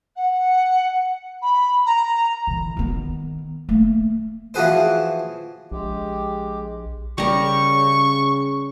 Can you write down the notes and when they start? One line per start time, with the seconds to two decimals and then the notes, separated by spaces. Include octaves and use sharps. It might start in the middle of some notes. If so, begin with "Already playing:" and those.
0.15 F#5
1.41 B5
1.86 A#5
2.47 D3 E3
2.77 D#3 B3
3.69 A3 A#3
4.54 E3 F3 F#4 G#4 B4 C5
5.72 A#1 G#3 G4
7.18 C#3 G3 A#4 C#6